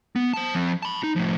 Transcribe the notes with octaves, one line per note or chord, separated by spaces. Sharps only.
B3
C5 A5
F3 C4
A5 B5
D#4
A2 F3